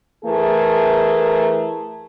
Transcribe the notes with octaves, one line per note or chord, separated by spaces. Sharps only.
E3 A3 G#4 A#4